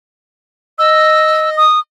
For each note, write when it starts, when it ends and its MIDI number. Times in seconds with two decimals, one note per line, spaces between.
0.79 1.64 75
0.79 1.50 88
1.57 1.80 87